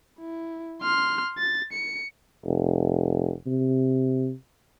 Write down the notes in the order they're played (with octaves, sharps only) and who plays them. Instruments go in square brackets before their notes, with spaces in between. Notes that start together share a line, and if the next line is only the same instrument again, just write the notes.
[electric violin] E4
C6 F6
A6
C#7
[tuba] F1
C3